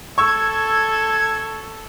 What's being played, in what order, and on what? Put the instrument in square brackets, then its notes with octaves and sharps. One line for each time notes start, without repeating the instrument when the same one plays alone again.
[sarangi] A4 [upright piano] C#6 E6 [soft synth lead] G#6